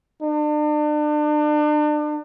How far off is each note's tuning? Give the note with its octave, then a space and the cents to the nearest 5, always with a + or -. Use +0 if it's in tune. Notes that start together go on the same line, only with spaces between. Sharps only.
D4 +35